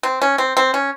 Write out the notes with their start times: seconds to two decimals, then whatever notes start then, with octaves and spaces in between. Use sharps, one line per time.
0.03 C4
0.22 C#4
0.38 C4
0.57 C4
0.74 C#4